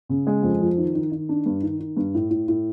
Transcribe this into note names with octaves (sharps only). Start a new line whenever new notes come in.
C#3
G#3
F2
F3
D#3
D#3
D#3
D4
G2
D#3
D#3
G2
A2
A2
A2